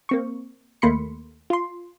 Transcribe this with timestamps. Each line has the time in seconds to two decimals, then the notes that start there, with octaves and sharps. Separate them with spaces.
0.09 A#3 C4 C#6
0.82 D#2 A3 A#3 B5 C6 C#7
1.50 F4 C6